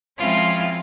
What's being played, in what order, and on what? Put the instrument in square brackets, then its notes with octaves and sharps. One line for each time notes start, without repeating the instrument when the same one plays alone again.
[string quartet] F3 G#3 C4 C#4 E4 F4